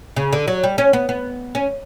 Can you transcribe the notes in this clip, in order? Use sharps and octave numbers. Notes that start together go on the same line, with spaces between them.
C#3
D3
F#3
G3
C#4
B3
B3
C#4